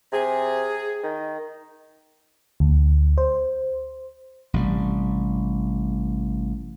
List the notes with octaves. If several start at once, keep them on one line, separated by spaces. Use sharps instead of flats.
C3 G#4
D#3
D2
C5
A1 C3 G3